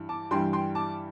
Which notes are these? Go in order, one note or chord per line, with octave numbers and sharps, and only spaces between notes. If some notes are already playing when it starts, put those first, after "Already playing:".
Already playing: G2 E3
A5 D6
G2 E3 G3 G5 C6
G5 C6
A5 D6